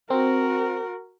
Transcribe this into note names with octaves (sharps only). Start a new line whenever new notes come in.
C4 F#4 A#4